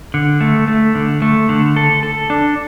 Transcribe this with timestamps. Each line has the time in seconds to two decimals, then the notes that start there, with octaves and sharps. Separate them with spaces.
0.14 D3
0.41 A3
0.68 A3
0.95 D3
1.22 A3
1.49 D3
1.76 A4
2.03 A4
2.30 D4